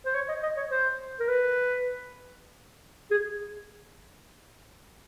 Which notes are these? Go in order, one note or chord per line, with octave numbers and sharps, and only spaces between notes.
C5
C#5
D#5
D#5
C#5
C5
A#4
B4
G#4